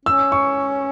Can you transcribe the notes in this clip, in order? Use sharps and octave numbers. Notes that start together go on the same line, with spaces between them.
C#4 E6
C#6